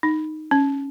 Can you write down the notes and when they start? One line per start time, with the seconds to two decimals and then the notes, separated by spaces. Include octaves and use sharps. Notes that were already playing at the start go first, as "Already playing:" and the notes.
0.03 D#4
0.51 C#4